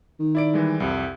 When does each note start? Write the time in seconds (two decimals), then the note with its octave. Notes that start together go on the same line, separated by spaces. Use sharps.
0.20 D#3
0.35 E4 D5 D7
0.54 E3 G3 G#3
0.80 C2 F2 G4